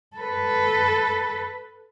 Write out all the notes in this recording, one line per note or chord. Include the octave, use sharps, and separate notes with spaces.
A4 B4